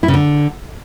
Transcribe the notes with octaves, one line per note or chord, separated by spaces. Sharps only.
E4
C#3
D3